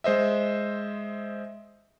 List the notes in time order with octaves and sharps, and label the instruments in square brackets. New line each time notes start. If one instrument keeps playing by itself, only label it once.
[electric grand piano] G#3 C5 D#5 E5